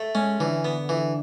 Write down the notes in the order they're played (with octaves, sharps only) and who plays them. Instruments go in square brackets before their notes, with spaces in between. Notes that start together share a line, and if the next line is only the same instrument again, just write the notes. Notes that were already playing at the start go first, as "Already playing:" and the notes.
Already playing: [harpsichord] A3
[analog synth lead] G#3 [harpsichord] C#4
[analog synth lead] D3 [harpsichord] E3
[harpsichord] B3
E3